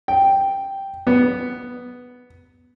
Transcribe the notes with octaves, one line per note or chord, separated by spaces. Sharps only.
G5
B3